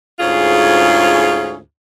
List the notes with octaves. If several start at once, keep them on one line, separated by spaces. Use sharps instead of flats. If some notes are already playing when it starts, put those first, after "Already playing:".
D2 G#2 C#4 F4 G#4